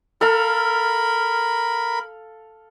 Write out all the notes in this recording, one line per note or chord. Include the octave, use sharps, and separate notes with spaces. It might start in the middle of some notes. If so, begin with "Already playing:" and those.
A4 A#4 F5 B5